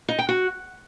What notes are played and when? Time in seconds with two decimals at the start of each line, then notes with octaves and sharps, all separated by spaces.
0.08 D#4
0.19 G5
0.29 F#4